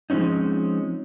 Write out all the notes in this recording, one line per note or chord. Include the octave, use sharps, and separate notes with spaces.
F3 G#3 C4 C#4 D#4